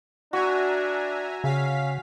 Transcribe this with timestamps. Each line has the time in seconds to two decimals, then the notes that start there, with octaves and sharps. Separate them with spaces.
0.33 D4 F#4 E5 G#5 A#5
1.44 C#3 C#4 F5 B6